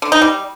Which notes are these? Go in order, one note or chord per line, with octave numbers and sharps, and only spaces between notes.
D3
D#4
G3